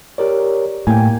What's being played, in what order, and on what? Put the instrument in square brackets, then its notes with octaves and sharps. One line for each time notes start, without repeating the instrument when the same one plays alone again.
[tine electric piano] G4 A#4 C#5 [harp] D5
[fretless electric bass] A2 [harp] A#3 G#6 [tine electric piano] G5 G#5